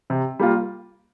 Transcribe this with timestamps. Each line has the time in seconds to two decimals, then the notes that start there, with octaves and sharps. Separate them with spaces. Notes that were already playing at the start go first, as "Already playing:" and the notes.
0.10 C3
0.39 G3 A#3 F4